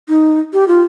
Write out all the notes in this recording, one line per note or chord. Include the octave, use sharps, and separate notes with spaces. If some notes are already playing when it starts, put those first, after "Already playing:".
D#4
G4
F4